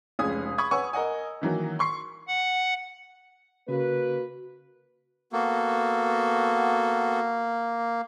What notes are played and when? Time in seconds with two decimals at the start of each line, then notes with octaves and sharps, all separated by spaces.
0.19 F1 C#2 C#4 G#4 D#6 G#6
0.58 B5 C#6 D#6 G#6
0.71 B4 C#5 F#5 G#5 C#6 E6
0.93 A#4 D#5 F#5 G#5
1.41 D#3 E3 F#3 A#3
1.79 C6 C#6 C7
2.28 F#5
3.69 C#3 A#3 F#4 B4
5.33 A#3 B3 F#4 A4